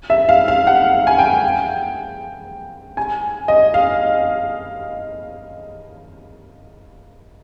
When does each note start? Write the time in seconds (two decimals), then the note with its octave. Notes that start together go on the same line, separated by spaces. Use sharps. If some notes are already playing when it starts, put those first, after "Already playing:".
0.10 E5
0.29 F5
0.48 F5
0.67 F#5
1.07 G#5
1.19 G5
2.97 G#5
3.48 D#5
3.74 F5